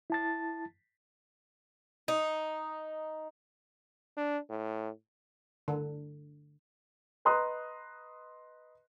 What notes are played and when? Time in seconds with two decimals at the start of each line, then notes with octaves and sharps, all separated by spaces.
0.10 E4 A5 A6
2.08 D#4
4.17 D4
4.50 A2
5.68 D3
7.25 B4 D#5 A#5 C6 D#6 F#6